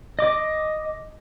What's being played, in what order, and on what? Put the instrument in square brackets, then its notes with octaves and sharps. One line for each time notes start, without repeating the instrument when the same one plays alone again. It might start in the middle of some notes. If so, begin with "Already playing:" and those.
[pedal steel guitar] D#5 D6